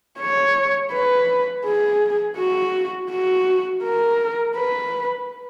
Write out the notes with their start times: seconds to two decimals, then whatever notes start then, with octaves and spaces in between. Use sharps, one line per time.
0.20 C#5
0.92 B4
1.65 G#4
2.38 F#4
3.11 F#4
3.83 A#4
4.56 B4